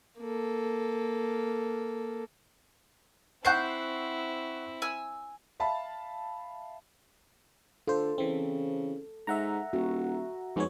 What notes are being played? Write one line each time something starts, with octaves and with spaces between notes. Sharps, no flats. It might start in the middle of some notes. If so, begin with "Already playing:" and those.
A#3 A4
C4 E4 C5 F#5 C#6 F#6 G6 C7
G#5 E6
E5 F5 A5 B5
D3 F4 A4 C5
C#3 E3 C4
G#2 E5 F#5 A#5
D#1 F#4
F2 G#2 B3 C#5